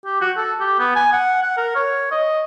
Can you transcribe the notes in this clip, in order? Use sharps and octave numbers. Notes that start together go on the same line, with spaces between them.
G4
F#4
A4
G4
B3
G#5
F#5
F#5
A#4
C#5
D#5